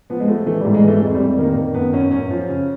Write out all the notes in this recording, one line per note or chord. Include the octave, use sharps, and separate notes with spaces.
F3 B3
G#3
F3 A3
E3 A3
G#2 G3
G#3
E3 A3
F2 G#3
G3
F2
D#3 A#3
D#3
F#2 B3
F#2 C#4
F#2 C#4
F3
C#3